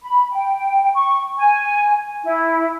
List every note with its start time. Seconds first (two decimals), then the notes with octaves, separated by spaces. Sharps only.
0.02 B5
0.31 G5
0.95 C#6
1.38 G#5
2.23 E4